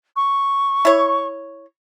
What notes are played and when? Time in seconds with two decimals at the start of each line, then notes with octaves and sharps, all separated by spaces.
0.16 C#6
0.85 E4 C#5